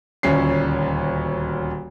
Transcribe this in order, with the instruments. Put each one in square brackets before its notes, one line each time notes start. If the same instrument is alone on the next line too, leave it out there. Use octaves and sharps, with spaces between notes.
[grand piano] D#1 D2 C#4 C7